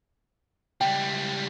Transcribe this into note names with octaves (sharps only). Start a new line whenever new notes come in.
C#2 G3 G5